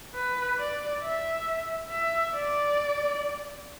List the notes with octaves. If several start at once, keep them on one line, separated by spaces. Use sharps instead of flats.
B4
D5
E5
E5
D5